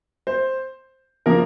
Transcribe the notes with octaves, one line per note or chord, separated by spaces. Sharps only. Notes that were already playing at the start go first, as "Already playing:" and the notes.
C5
C#3 F3 A#3 A#4